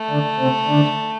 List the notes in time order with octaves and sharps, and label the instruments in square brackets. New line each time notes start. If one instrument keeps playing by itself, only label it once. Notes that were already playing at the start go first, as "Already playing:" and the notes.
Already playing: [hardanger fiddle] A3
[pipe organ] D3 D4
C3 C4
D3 D4